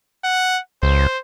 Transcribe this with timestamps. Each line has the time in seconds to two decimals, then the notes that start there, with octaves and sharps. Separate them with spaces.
0.25 F#5
0.83 C#2 C5